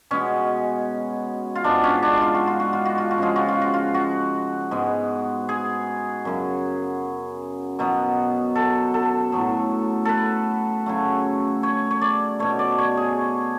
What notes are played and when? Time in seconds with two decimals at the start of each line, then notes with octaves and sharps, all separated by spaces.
0.11 B2 G#3 B3 C#4
1.55 F4
1.64 G#2 G#3 B3 D4
1.84 C#4
2.03 D4
2.22 F4
2.35 F#4
2.47 F4
2.60 F#4
2.73 F4
2.85 F#4
2.98 F4
3.11 F#4
3.18 C#3 F3 G#3 F4
3.36 F#4
3.48 F4
3.61 F#4
3.74 F4
3.94 F#4
4.71 G#2 G#3 B3
5.49 G#4
6.25 F#2 C#3 F#3
7.79 B2 F#3 B3
8.55 A4
8.94 A4
9.32 A2 F#3 B3
10.05 A4 B4
10.86 C#3 F#3 A3
11.63 C#5
11.91 C#5
12.01 D5
12.39 B2 A3 C#5
12.59 D5
12.78 C#5
12.97 G#4